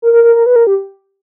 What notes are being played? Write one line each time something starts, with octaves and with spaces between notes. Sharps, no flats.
A#4
A#4
A#4
A#4
B4
A#4
G4